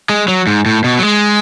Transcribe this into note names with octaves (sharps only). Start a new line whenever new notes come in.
G#3
F#3
G#2
A2
B2
F#3
G#3